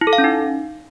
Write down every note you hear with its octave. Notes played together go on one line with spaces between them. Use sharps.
E4
A4
F5
C#4
D#4